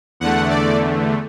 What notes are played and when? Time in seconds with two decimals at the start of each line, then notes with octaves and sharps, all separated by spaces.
0.20 E2 D3 A3 F#5
0.50 D5